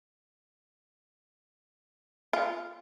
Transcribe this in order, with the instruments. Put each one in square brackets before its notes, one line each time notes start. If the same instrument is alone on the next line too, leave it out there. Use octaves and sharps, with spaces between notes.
[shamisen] F4